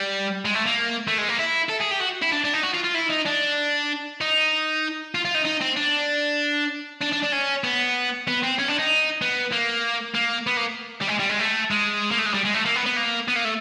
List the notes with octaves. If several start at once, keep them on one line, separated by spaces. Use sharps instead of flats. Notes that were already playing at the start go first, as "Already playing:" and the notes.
Already playing: G3
G#3
A3
A#3
A3
G#3
A#3
E4
A4
G#4
G4
F#4
E4
D4
D4
D#4
F#4
F4
F4
E4
D#4
D4
D#4
F4
F4
D#4
D#4
C4
D4
D4
D4
D4
C#4
B3
B3
C4
C#4
D4
D#4
B3
A#3
A#3
B3
A#3
G3
G#3
G3
G#3
A3
G#3
A#3
A3
G#3
G3
G#3
A3
A#3
B3
B3
A#3
B3
A#3
A3